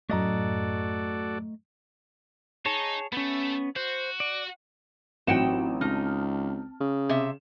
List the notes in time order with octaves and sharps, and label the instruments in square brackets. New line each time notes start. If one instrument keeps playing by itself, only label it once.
[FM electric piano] F#2 A2 [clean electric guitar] A3 D#5 A#5 [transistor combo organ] F#4 A4 D5
[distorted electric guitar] D#4 [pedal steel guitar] G#4 C#5 A5
[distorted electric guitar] A3 [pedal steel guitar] B3 C#4
[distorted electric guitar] F#4 [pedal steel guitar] C5
[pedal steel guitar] D5
[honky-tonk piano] A1 F#3 E7 [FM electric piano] C4 [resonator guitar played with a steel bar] D#4 F#5 G5
[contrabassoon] C#2 [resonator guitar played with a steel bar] D#4 [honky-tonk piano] A5 F6
[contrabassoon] C#3
[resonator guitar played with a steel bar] C3 E5